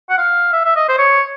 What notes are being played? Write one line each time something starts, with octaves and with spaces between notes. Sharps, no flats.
F#5
F5
E5
E5
D#5
C5
C#5